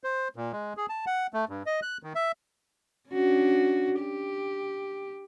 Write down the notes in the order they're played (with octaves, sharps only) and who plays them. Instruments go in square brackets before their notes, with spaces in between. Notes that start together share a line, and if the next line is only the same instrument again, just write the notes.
[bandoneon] C5
A#2
G#3
G#4
A5
F#5
A3
G2
D#5
F#6
D#3
E5
[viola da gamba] C#4 D4 F#4
G4